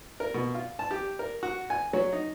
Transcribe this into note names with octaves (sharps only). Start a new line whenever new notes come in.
A#4
B2
F4
A5
G4
A#4
F#4
G#5
F#3
D#4